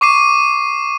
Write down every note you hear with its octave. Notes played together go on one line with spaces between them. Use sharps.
C#6 D6 C7 D#7